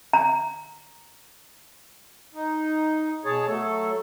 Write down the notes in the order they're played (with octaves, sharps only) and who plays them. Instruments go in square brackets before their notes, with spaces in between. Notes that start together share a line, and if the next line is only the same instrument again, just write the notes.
[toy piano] A#5
[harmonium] D#4
B2 G#4 C#5 A5
F#3 A3 A4